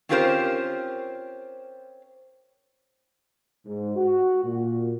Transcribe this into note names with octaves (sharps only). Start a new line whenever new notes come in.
C4 C#4 F4 G4 A#4 C5
G#2
F#4
A#2